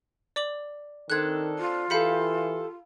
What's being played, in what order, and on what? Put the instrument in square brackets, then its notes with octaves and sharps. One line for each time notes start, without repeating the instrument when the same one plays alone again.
[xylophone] D5 D6 F#7
[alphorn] D#3 [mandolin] C4 D4 A4 [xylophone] F#6 G#6
[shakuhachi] F4
[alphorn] E3 [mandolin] G4 A4 [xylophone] F5 B5 C#7